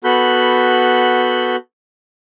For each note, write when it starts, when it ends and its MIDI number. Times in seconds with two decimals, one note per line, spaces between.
0.04 1.56 59
0.04 1.56 66
0.04 1.56 69
0.04 1.56 83
0.04 1.56 90
0.04 1.56 91